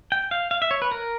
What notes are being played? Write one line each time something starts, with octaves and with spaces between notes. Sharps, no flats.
G5
F5
F5
E5
C#5
B4
A#4